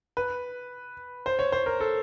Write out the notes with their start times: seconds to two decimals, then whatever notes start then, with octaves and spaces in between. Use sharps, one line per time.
0.17 B4
1.26 C5
1.39 C#5
1.52 C5
1.66 A#4
1.80 A4